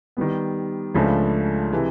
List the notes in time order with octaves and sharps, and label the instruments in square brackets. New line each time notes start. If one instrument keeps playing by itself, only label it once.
[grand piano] D#3 G3 B3
C#2 C#3 F3 A3 D4
C3 E3 G#3